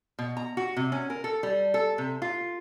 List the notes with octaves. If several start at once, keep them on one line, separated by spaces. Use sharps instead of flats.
B2
A#5
F#4
C3
C#4
A#4
A4
G3
A4
C3
F4